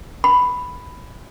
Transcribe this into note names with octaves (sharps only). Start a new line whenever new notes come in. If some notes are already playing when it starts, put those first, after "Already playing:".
B5